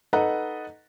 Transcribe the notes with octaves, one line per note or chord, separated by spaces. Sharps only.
D#4 A4 B4 D#5 F#5 A#5